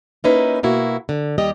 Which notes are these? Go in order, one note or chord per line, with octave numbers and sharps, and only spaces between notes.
A#3 C#4 D#4 E4 B4
B2 A#3 E4 F#4
D3
D#2 G3 G4 D#5